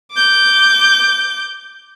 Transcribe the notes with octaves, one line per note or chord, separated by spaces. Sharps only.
D6 G6